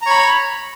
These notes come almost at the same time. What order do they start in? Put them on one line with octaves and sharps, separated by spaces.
A#5 C#5 B5